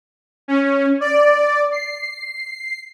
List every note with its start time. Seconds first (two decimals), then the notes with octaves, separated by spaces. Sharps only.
0.48 C#4
1.01 D5
1.72 C7